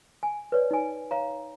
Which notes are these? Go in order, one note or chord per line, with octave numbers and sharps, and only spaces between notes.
G#5
B4 C#5 D5
D#4 G#5
C#5 F5 A#5